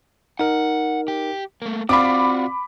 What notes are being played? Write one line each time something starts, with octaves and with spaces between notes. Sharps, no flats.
D#4 A#4 F#5
G4
A3 A#3
C4 F4 F#4 D5 F5 B5 D6